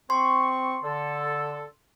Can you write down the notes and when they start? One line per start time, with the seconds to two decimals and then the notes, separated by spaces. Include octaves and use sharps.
0.10 C4 C6 C#6
0.83 D3 A4